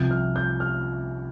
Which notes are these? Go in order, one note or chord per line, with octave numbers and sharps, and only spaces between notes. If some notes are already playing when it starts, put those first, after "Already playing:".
Already playing: C2 C3 F3 G6
F6
G6
F6